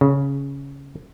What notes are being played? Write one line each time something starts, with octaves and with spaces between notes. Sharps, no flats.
C#3